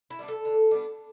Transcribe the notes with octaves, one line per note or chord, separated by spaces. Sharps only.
E4
G3 B3 D4
A4
D3
G3 B3 D4